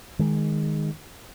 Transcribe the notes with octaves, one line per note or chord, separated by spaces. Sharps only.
D#3 G#3